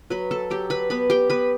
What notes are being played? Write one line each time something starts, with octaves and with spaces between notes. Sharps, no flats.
F#3 B4 B5
A4 A5
F#3 G4 G5
B4 B5
B3 B4 B5
G4 G5
B3 B4 B5